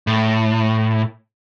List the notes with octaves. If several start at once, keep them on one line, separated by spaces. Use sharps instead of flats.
A2